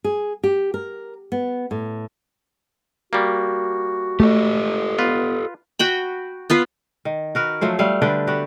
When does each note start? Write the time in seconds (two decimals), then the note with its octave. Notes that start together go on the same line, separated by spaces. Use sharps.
0.04 G#4
0.43 G4
0.74 A#4
1.32 B3
1.71 A2
3.13 G3 A#3 F#4
4.20 A3 G4 A4 D#5
4.99 B3 F4 B4
5.79 F#4 G5 B5
6.50 B3 F4 B4
7.05 D#3
7.35 F#4 A#4 B4
7.61 F3 F#3 A3 C5
7.79 G3 A3 F5
8.02 D3 D4 B4 G5
8.27 B3 F#4 G4